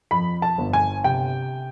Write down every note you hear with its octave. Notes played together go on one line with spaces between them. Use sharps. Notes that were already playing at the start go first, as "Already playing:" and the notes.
F2 B5
A5
G1
G#5
C3 G5